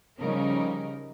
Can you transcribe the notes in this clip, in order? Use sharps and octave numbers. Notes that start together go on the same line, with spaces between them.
C#3 F3 G3 C#4 D#4 A#4